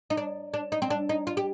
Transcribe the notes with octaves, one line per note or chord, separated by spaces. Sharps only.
D#4
D4
D4
D#4
C4
D4
D#4
F4
G4